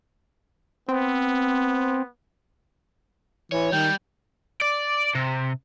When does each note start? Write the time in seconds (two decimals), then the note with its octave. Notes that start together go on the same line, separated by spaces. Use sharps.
0.88 B3 C4
3.52 E3 C#5
3.72 D#3 G3 G5
4.62 D5
5.15 C3